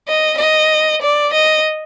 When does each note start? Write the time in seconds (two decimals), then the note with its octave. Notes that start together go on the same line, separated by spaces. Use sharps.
0.08 D#5
0.38 D#5
1.02 D5
1.33 D#5